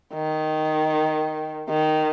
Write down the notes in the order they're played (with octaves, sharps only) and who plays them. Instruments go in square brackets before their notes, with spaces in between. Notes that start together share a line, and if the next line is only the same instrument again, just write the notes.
[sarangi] D#3
D#3